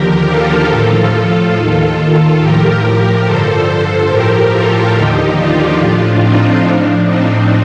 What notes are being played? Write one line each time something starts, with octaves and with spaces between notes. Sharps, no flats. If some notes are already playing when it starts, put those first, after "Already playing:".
Already playing: D#2 D3 F3 G4 A#4
F4 A4
A2 F3
D#2 D#3 F4 A4
A2 F3 G4 A#4
G2 D3 F3 A4 C5
A2 F3 G4 A#4
F4 A4
D#2 D3 F3 D#4 G4
D4 F4
A2 F3
C4 D#4
A2 F3 D4
C4 D#4